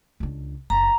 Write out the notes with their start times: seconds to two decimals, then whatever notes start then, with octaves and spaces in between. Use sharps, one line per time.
0.20 C#2 D4
0.70 F#1 A#5